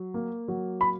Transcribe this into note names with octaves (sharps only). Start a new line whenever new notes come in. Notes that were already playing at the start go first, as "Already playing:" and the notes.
Already playing: F#3
A#3
F#3
B5